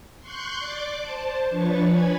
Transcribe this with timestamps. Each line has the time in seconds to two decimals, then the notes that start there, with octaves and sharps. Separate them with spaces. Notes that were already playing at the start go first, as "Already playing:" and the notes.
0.20 C6 C#6 F#6 G6
0.58 D5 D6
1.01 C5 A5
1.50 F3 D4 B4 C#5 C#6 A6
1.82 C#5 G#5 B5 G#6